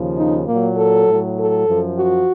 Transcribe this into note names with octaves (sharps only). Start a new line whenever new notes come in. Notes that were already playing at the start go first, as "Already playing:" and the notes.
Already playing: D#2 C#3 F3
D#4
A#2 F#3 A#3
A4
A2 F#3
A4
F#2 F3
F#4